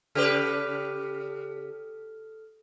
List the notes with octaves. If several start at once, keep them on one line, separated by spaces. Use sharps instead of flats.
C#3 G4 A4 B4 F6